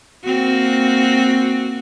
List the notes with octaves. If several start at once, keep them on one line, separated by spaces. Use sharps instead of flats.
A#3 C4 F#4